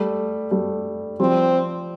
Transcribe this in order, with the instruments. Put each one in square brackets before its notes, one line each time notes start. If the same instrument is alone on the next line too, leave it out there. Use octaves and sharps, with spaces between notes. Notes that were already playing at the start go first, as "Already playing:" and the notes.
Already playing: [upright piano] G3 A3
G3 A3
[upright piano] F3 G3 [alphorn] C4